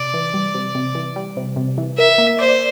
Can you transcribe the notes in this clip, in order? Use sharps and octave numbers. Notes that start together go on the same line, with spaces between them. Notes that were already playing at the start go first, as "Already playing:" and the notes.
Already playing: C3 D5
E3
G3
C3
C3
E3
G3
C3
C3
E3
A#4 E5
A#3
C5 D5